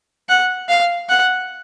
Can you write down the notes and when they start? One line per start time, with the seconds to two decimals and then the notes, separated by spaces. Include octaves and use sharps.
0.29 F#5
0.69 F5
1.09 F#5